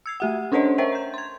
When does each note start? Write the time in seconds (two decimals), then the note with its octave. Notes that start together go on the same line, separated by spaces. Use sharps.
0.06 E6 G#6 C7
0.20 A3 G4 F#5
0.52 C#4 D4 A4 C5 C#5 D#5
0.78 A#4 C5 C#5 E5 G5
0.92 A#5 G6
1.14 C6 G#6